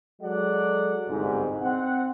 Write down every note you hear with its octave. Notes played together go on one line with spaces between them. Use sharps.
F#3 G#3 A4 D5 F#5
G1 C2 G#2
C4 F#5